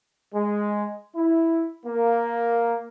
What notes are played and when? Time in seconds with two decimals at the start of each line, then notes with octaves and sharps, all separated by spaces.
0.34 G#3
1.16 E4
1.86 A#3